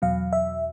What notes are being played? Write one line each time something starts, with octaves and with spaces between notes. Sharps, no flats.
E2 B2 F#3 F5
E5